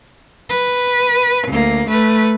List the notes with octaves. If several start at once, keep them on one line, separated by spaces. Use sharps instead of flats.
B4
D2 A#3
A3 B4